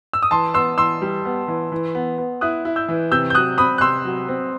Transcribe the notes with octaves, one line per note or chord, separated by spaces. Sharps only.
E6
D#6
E3 A5 C6
B3 C6 E6
E3 C6 E6
G3
B3
E3
E3
B3
B3
E4 D#6 F#6
E4
E6 G6
E3
C3 E6 G6
G6
F#3 D#6 F#6
C4 B5 D#6
F#6
C3 C6 E6
F#3
C4